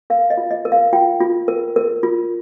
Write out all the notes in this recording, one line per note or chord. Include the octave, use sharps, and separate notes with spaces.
A#4 F5
D#5
F4
D#5
A#4
F5
F4 G5
F4
A#4
A#4
F4